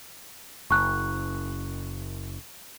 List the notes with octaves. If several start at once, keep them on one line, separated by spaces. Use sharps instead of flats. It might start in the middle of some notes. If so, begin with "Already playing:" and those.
F#1 C#6 F#6